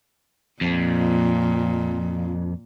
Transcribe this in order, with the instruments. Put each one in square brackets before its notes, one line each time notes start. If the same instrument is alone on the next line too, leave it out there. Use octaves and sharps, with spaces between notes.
[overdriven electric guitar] F2 [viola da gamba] A#2